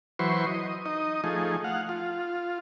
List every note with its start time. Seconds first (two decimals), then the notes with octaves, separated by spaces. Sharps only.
0.19 E3 F#3 B4 C5 C6 C#6
0.46 D#5
0.86 D#4 D#5
1.24 F3 A3 D#4 G#4
1.64 F5 F#5
1.89 F4